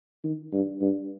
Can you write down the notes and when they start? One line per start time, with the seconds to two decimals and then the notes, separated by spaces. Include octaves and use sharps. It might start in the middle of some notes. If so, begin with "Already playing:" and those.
0.24 D#3
0.52 G2
0.81 G2